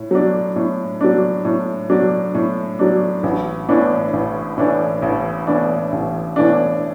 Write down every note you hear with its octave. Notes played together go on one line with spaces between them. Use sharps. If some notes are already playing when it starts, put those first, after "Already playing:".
Already playing: A2
F#3 D4
A2
F#3 D4
A2
F#3 D4
A2
F#3 D4
A1
A2 E3 D4
A1
A2 E3 D4
A1
A2 E3 D4
A1
A2 E3 D4